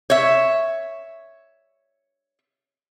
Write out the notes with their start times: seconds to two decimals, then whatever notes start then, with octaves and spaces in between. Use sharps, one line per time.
0.10 C#5 E5